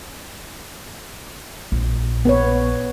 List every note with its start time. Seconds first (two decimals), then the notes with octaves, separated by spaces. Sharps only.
1.72 A#1
2.25 B3 B4 C#5